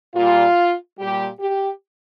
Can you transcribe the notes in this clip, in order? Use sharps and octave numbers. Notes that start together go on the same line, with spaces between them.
A#2 G3 F4
A#2 G3 G4
G4